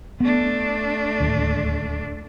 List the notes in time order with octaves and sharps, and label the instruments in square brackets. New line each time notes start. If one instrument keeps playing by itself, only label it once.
[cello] A3 D4 [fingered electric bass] B3
[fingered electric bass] D1 D#2